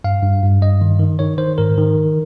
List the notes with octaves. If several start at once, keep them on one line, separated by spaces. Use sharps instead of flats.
G2 F5
G2
G2
G2 D#5
D#3
D#3
D#3 C#5
D#3 C5
G#2 A#4
D#3